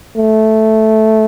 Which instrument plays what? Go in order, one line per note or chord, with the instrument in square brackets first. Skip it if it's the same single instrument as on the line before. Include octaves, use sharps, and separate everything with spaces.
[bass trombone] A3